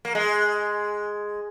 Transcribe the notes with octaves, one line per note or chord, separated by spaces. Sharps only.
A#3
G#3